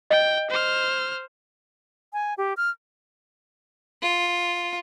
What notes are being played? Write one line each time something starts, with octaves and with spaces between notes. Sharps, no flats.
D#5 G5
C5 F6
G#5
G4
F6
F4